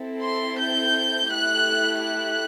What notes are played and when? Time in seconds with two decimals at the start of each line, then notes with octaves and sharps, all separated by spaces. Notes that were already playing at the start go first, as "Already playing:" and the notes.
Already playing: C4 E4 A4
0.22 C6
0.58 G6
1.29 A3 E4 G4 F#6
2.01 F#6